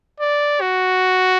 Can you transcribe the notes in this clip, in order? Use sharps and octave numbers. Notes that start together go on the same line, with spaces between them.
D5
F#4